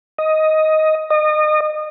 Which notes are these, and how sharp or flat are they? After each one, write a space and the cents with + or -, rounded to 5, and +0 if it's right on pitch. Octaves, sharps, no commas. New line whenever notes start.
D#5 +10
D#5 -30